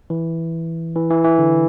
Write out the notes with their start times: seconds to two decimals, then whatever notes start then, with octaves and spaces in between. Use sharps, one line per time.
0.10 E3
0.96 E3
1.10 E3
1.24 E3
1.39 D3